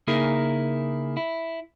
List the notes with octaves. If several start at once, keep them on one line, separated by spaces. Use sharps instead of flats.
C#3 A#3 D#4 E4 G#4 A#4
E4